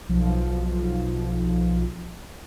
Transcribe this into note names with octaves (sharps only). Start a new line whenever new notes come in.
B1 F3